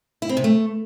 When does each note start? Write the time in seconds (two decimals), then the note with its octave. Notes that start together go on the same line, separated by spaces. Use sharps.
0.22 E4
0.29 C4
0.37 C3
0.44 A3